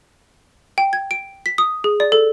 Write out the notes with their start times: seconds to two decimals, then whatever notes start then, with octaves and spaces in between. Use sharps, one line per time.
0.78 G5
0.93 G#6
1.11 D7
1.46 B6
1.58 D#6
1.84 G#4
2.00 D5
2.12 A4